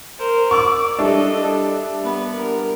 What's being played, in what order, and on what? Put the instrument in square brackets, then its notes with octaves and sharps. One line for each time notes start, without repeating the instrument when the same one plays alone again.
[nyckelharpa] A#4 C5
[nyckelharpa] D5 [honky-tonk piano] C#6 D6 E6
[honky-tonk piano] G3 D4 E4 [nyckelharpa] A4 D#5
[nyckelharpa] A4
B3 B4
A#4